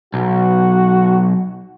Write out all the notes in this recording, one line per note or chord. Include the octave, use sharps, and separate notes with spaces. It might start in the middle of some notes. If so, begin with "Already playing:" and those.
B1 F#4